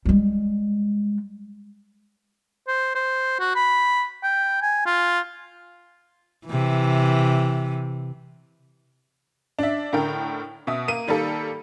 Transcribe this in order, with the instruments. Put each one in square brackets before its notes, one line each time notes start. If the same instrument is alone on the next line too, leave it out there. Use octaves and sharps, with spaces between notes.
[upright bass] G3 G#3
[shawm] C5
C5
F#4
B5
G5
G#5
F4
[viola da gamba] C3 E3
[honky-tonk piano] D4 E5
A2 D3 A#4 G5
B2 E5 D#6
A#3 D#7
D#3 G3 A#3 A4